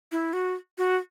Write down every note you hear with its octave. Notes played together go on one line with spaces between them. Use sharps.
E4
F#4
F#4